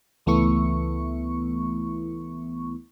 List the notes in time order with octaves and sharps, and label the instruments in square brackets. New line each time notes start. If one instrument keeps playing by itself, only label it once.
[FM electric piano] C#2 E3 A3 B3 E4 C#6